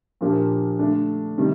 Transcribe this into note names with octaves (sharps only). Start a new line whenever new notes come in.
A#2 F3 A#3 D4 G4
D3 A3 D4
C3 D#3 G3